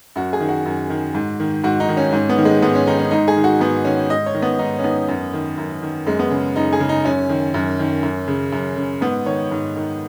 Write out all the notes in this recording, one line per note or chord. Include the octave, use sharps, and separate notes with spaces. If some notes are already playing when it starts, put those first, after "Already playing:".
F#2 F#4
G#4
D#3
F#4
F#2
D#3
G#2
D#3
G#2 F#4
D#4
D#3
C#4
G#2 C#4
B3
D#3
G#3
G#2 B3
C#4
D#3 D#4
C#4
G#2 D#4
G#4
D#3
F#4
G#2 B3
D#3 C#4
G#2 D#5
C#5
D#3
B3
G#2 D#4
C#4
D#3 B3
F#2
D#3
F#2
D#3
F#2 G#3
B3
C#3
F#2 D#4
G#4
C#3
D#4
F#2 C#4
D#3
F#2
D#3
F#2
C#3
F#2
C#3
G#2 B3
D#3 C#5
G#2
D#3